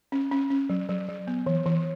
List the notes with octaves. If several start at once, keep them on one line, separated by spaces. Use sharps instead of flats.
C#4
C#4
C#4
F#3
F#3
F#3
B3
E3
E3